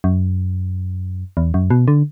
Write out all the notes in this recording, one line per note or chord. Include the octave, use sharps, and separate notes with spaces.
F#2
E2
F#2
B2
D3